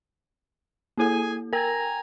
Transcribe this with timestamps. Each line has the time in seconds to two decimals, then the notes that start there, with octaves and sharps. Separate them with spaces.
0.97 A#3 E4 G#4 A4 G#5
1.53 A#4 G5 G#5 A#5